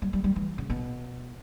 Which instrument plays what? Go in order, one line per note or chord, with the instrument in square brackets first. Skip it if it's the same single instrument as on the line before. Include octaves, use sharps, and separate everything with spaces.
[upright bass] G3
G3
G3
E3
C#3
B2